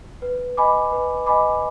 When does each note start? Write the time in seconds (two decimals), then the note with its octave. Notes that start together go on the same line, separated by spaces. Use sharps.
0.22 B4
0.57 D#5 G#5 B5 D6
0.92 B4
1.26 D#5 G#5 B5 D6